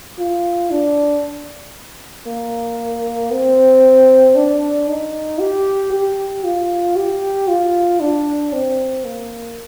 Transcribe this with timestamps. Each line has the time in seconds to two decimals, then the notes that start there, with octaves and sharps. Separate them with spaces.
0.19 F4
0.71 D4
2.27 A#3
3.31 C4
4.36 D4
4.88 D#4
5.39 G4
5.92 G4
6.44 F4
6.96 G4
7.48 F4
8.00 D4
8.53 C4
9.05 A#3